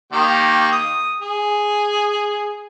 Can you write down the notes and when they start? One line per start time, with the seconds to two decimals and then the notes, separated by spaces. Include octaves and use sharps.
0.12 D#3 A#3 G4
0.73 D#6
1.21 G#4